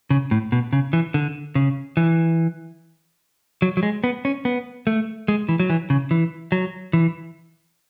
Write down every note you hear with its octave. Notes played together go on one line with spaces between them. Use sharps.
C#3
A2
B2
C#3
E3
D3
C#3
E3
F#3
F#3
G#3
B3
C#4
B3
A3
G#3
E3
F#3
E3
C#3
E3
F#3
E3